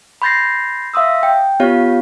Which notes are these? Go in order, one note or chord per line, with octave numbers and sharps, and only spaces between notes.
B5 C6 G6 A6 A#6 C7
E5 F5 C6 D#6 E6
G5
B3 F4 G4 C#5 F5